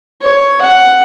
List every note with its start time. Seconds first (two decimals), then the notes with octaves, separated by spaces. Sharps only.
0.22 C#5
0.61 F#5